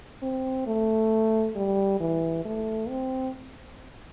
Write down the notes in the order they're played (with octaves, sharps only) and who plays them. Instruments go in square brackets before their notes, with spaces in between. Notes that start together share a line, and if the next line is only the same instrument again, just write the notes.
[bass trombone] C4
A3
G3
E3
A3
C4